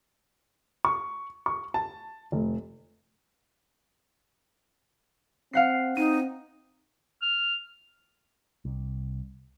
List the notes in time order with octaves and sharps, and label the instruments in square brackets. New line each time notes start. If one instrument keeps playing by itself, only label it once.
[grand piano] C#6
C#6
A5
F1
[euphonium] C4 [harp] F5 F#5 C7
[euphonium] C4 [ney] D#4 [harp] D#7
[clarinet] F6
[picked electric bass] C2